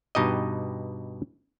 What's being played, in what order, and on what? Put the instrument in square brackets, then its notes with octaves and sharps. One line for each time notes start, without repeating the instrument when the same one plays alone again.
[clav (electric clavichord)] G2 B2 D#4 G4 D#5